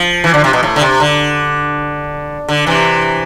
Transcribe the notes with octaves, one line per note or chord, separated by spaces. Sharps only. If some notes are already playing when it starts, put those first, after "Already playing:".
Already playing: F3
E3
D3
C3
B2
A2
D3
C3
D3
D3
C3 E3